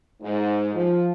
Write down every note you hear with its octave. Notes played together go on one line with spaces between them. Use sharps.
G#2
F3